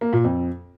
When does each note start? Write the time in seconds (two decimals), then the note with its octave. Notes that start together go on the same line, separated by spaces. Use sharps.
0.01 A#3
0.13 A#2
0.24 F2